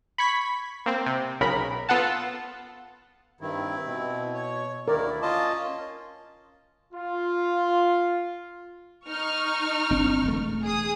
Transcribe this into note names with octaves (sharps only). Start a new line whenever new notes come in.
B5 C#6 G#6 B6
A#3 C4
C3
B1 C#3 A#4 B5
B3 F4 A4 F#5 A5
G2 D#3 C4 E4
B2
C#5
D2 D#3 E4 A#4 D5
A#3 C#4 F4 D#5 A5
F4
D#4 C#6 F6
G1 C4 D4
E1 A3
G#4 D#6